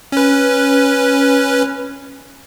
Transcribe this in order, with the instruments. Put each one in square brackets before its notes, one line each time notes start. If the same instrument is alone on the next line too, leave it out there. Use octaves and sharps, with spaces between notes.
[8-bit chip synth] C#4 B4